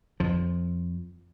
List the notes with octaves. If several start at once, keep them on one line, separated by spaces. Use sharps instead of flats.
F2 F3